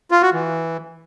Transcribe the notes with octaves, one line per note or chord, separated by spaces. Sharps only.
F4
F#4
E3